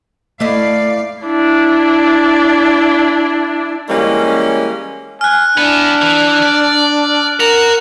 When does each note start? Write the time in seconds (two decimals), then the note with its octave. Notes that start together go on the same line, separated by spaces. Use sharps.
0.40 A3 E4 D5 D#5 F5
1.22 D4 E4
3.89 E3 G3 G#3 A#3 C#4
5.21 G#5 F6 F#6
5.58 B3 D4 E4
6.02 E3
6.43 D5
7.40 F#4 A#4 F7